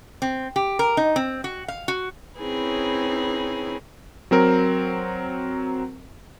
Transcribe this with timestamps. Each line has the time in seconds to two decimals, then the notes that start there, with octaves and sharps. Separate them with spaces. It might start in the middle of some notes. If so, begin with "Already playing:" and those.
0.22 C4
0.56 G4
0.79 A#4
0.97 D#4
1.16 C4
1.44 F#4
1.68 F5
1.88 F#4
2.39 C4 C#4 D#4 E4 G#4 B4
4.31 F#3 C4 A#4